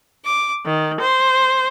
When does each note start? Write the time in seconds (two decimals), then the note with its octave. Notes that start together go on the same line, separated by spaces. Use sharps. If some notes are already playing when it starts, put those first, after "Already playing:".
0.24 D6
0.66 D#3
1.00 C5